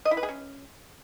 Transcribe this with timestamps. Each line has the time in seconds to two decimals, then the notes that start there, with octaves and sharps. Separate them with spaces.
0.05 D#5
0.11 E4
0.17 B4
0.23 G#4
0.29 C#4